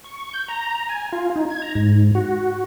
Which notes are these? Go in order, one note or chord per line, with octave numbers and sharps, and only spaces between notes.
C#6
G6
A#5
G#5
F4
D#4
G#6
A#5
G#2
F#4